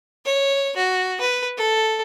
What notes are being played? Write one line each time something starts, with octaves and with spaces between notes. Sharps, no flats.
C#5
F#4
B4
A4